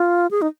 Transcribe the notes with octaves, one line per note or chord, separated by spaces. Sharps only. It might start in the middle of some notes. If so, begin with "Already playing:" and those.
Already playing: F4
G#4
D#4